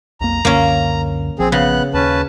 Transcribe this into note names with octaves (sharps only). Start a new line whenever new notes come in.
B1 F2 A#3 A#5
C#2 F#2 D3 A#3 C#4
A#1 F3 C4 G#4
C#3 B3 F#6
D#2 C#4 B4 A5